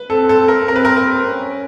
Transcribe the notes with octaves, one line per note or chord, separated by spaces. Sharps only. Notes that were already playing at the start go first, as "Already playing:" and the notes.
Already playing: B4
C4 A4
A4
A#4
C4 A#4
B4
A#4
A#4
C#4